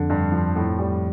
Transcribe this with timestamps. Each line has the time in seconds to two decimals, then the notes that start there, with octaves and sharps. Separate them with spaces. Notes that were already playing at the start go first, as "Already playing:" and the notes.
Already playing: F2 D3
0.10 G2
0.32 F3
0.56 A2
0.78 G3